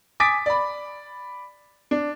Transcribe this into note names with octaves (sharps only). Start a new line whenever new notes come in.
G#5 D6 D#6 A6 B6 D7
D5 B5
D4